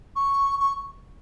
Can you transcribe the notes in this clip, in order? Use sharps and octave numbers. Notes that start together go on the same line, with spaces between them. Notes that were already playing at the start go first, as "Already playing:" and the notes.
C#6
C#6